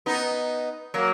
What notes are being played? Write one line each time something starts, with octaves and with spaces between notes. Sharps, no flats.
B3 D#4
F#3 A#3